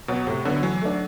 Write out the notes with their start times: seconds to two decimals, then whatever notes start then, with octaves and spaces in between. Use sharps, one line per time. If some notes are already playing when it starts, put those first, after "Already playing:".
0.08 B2 F#3 B3
0.27 A2 C3
0.45 D3 F#3 B3
0.63 E3 F#3
0.81 A3 D4